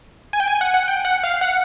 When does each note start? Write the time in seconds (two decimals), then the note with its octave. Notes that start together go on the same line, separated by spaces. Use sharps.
0.33 G#5
0.40 G5
0.48 G#5
0.61 F#5
0.74 F#5
0.88 G5
1.05 F#5
1.23 F5
1.41 F#5